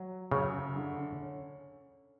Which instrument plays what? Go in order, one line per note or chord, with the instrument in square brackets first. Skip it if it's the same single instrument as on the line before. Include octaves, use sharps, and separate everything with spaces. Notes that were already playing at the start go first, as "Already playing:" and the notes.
Already playing: [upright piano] F#3
[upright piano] F#2 [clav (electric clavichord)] C#3
[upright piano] D3
C#4